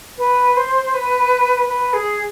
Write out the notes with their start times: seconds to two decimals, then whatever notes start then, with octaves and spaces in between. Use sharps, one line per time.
0.18 B4
0.57 C5
0.94 B4
1.69 B4
1.93 G#4